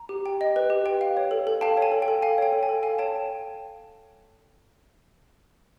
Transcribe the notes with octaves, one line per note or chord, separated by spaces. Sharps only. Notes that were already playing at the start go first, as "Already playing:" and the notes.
Already playing: A#5
G4
G5
D#5
B4
G4
G5
F5
C#5
A4
A4
F5 G5 A5
C#5 G#5
A4
G5
A4
F5 G#5
C#5 G5
A4
G#5
A4
F5 G#5
C#5 G5 A5